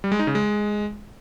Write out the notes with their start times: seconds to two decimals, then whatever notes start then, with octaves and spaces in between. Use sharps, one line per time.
0.04 G3
0.12 G#3
0.19 D#4
0.27 C#3
0.35 G#3